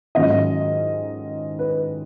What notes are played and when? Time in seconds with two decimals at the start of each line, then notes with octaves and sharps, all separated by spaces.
0.15 G#2 D#3 F#3 C#4 F4 D#5
1.59 B4